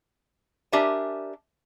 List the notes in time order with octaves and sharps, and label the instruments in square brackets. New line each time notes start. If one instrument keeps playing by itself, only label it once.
[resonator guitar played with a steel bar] D4 G4 A#4 E5 G#5 A5